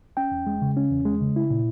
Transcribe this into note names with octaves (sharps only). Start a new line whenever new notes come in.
C#4 G5
E2
G#3
C#3
C#4
E2
G#3
C#3
E4
A#2